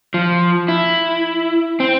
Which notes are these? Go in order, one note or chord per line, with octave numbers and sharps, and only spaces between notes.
F3
E4
C4